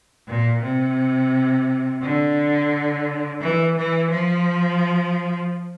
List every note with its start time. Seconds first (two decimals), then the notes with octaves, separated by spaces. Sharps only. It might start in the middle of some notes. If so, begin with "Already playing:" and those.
0.28 A#2
0.62 C3
2.02 D3
3.41 E3
3.76 E3
4.11 F3